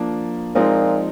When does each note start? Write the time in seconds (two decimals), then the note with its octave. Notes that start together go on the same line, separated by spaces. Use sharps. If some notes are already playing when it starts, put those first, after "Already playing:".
Already playing: F3 A#3 D4
0.55 A#2 F3 G#3 C4 D#4